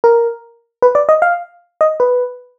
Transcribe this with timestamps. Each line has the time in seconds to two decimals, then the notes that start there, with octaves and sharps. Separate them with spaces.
0.04 A#4
0.82 B4
0.95 D5
1.09 D#5
1.22 F5
1.81 D#5
2.00 B4